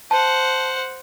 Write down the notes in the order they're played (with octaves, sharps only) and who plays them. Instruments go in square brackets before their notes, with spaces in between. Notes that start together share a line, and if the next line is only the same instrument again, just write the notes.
[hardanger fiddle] C5 F#5 [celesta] A5